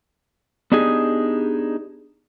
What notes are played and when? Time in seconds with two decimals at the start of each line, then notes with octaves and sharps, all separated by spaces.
0.72 B3 D4 D#4 G4 G#4